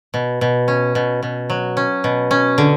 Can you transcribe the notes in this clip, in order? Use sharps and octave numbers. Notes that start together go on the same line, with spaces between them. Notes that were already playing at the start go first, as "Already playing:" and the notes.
B2
B2
C#4
B2
B2
F#3
C#4
B2
C#4
D3